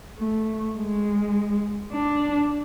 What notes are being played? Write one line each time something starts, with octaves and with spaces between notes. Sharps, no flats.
A3
G#3
D4